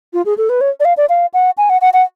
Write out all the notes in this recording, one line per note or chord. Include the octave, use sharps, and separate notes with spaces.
F4
G#4
A4
B4
C#5
D5
F5
D5
F5
F#5
G#5
F#5
F#5
F#5